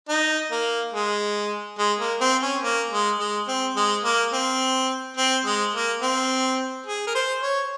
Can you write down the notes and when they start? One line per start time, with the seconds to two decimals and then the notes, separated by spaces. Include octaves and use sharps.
0.09 D#4
0.52 A#3
0.93 G#3
1.78 G#3
2.00 A#3
2.21 C4
2.42 C#4
2.63 A#3
2.91 G#3
3.20 G#3
3.48 C4
3.76 G#3
4.04 A#3
4.33 C4
5.17 C4
5.45 G#3
5.74 A#3
6.02 C4
6.86 G#4
7.07 A#4
7.15 C5
7.42 C#5